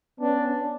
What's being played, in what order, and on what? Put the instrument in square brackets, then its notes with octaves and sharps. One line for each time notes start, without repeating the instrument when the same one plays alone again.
[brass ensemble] B3 C#4 [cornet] D4